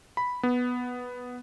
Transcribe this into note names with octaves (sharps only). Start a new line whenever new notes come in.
B5
B3